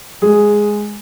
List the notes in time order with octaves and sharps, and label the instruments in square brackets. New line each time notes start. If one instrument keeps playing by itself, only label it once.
[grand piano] G#3 G#4